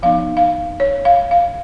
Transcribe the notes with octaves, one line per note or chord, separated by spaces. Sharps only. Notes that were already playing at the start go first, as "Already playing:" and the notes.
F3 B3 D#4 F5
F5
C#5
F5
F5